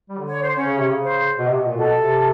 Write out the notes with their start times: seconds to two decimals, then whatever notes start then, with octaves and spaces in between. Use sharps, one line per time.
0.09 G3
0.19 D3
0.27 C#5
0.41 C5
0.54 C#4 C#5
0.65 C#3
0.78 C3
0.90 C#3
1.02 C5
1.39 B2
1.48 C3
1.57 B2
1.66 A#2
1.76 B2 A4
1.95 C3